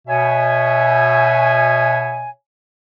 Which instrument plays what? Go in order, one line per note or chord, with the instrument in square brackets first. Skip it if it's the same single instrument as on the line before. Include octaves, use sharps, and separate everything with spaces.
[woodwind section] B2 C#5 E5 G#5